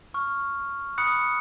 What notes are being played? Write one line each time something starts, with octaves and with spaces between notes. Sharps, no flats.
C#6 F6
B5 D#6 F#6 C#7